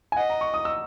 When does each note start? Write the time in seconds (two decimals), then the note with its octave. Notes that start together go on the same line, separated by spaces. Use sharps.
0.12 G#5
0.16 D#5 F#5
0.30 A#5
0.41 C#6
0.54 D#6
0.65 E6